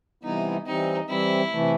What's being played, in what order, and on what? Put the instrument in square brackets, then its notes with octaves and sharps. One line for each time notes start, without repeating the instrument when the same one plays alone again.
[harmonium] C3 E3 G3 B3 E4 [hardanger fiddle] D#4
[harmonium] E3 G3 C4 [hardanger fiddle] D#4
[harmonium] E3 G3 C4 [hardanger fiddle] E4
[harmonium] C3 E3 A3